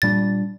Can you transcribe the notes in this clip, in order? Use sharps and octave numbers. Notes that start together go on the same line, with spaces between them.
A#2 G3 D4 A6